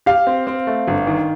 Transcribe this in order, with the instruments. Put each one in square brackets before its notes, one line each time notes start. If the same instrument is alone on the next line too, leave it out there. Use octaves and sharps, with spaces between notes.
[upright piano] G4 [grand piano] F5
[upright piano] C4
C4
A3
G1
D#3